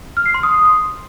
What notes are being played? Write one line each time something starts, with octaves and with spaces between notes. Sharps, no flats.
F6
C7
C6
D#6